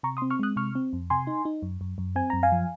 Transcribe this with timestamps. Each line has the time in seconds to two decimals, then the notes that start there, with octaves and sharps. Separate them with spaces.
0.03 C3 A#5 C#6
0.17 C6 D#6
0.22 C4
0.30 C#6 F6
0.39 G#3 D#6 F#6
0.56 C3 C#6 F6
0.75 C4
0.93 F2
1.10 C3 G#5 C6
1.27 D#4
1.45 D#4
1.63 F#2
1.81 F#2
1.98 F#2
2.16 C4 G#5
2.30 F#2 A#5
2.43 F5 G#5
2.52 F3